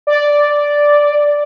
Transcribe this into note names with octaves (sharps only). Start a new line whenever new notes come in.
D5